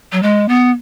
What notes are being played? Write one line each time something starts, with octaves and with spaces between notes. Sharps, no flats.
F#3
G#3
B3